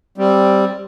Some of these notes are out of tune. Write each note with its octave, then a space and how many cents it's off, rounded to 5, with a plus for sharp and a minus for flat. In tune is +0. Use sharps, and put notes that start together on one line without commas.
G3 +0 C4 +0